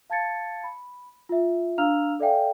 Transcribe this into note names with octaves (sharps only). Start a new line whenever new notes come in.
F5 A5 G#6 A6 C#7
B5
F4 E5
D4 F5 A#5 E6 F6 F7
A4 D5 E5 F5 G5 G#5